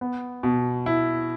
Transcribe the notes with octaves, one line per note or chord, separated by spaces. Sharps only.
B3
B2
E4